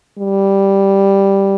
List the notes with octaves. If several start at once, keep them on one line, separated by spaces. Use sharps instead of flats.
G3